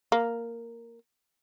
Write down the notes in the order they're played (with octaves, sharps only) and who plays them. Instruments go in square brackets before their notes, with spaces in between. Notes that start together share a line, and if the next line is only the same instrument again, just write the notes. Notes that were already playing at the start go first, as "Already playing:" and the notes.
[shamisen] A#3